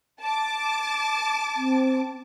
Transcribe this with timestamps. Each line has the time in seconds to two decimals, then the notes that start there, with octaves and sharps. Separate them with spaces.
0.20 A5 D6
1.56 C4